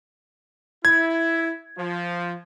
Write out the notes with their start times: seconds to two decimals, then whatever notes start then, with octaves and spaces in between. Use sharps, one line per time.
0.85 E4 G#6
1.78 F3